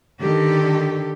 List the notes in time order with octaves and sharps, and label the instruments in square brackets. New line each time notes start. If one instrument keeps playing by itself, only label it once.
[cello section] D3 D#3 G4 A4